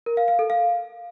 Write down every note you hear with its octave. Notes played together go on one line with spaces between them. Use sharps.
A#4
F5
F5
A4
F5